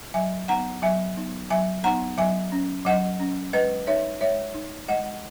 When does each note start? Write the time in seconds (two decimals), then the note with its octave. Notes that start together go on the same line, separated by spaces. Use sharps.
0.14 F#3 E5 G#5
0.48 B3 D#4 F#5 A#5
0.82 F#3 E5 G#5
1.17 B3 D#4
1.50 F#3 E5 G#5
1.84 B3 D#4 F#5 A#5
2.18 F#3 E5 G#5
2.52 C#4
2.85 F#3 D#5 F#5
3.20 C#4
3.53 G#3 B4 D#5
3.87 D#4 C#5 E5
4.21 G#3 C#5 E5
4.54 D#4
4.88 G#3 D#5 F#5